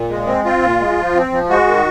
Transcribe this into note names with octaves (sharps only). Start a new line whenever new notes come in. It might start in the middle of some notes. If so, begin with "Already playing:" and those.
Already playing: A#2
G#3
C4
C4 F4
A#2
G#3
F3
C4
F3
G#3 F#4
D#3